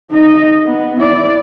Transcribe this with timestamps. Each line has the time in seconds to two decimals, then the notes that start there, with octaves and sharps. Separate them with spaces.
0.11 D#4 D#5
0.66 B3
1.00 E4 D5